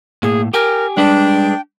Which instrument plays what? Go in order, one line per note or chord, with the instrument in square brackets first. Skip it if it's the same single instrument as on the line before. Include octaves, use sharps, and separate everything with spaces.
[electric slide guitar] A2 A#3 [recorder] G#4
[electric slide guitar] G4 G5 G#5 [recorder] A#4
[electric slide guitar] G3 G#3 B4 [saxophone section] D4 [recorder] G5